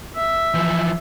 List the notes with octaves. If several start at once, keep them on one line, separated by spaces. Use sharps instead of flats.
E5
E3 F3